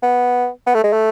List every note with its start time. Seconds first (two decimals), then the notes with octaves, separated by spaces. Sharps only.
0.02 B3
0.67 B3
0.75 A3
0.84 G#3
0.93 A3